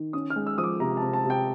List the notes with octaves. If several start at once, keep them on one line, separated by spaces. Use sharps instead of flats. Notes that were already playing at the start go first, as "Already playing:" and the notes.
Already playing: D#3
C#4 D#6
F6
G#3
E6
F3 D#6
D6
C3 A#5
C3 A5
A5
C3
G5